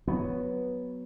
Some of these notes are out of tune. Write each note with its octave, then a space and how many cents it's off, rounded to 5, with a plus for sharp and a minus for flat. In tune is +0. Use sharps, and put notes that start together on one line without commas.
F#3 +0 B3 +0